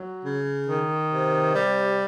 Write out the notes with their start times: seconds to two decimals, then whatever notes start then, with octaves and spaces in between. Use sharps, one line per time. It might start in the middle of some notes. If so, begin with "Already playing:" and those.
Already playing: F#3
0.23 C#3
0.66 D#3
1.09 C3
1.52 G3